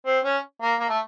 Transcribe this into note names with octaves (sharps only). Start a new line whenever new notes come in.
C4
C#4
A#3
A#3
A3